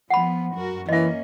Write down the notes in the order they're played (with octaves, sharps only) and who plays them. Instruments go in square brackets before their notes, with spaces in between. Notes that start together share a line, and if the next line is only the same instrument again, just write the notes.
[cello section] F3 B3 [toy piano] F#5 B5
[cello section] F#2 F#4 A#4
[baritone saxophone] E3 [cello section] A#3 C#4 [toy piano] D#5 E5